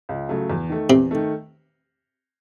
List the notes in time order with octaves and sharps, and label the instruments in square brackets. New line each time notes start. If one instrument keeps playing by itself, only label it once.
[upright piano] C#2
C#3 F#3 A3
E2
D#3 A3
[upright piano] E2 [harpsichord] C3
[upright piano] D#3 A3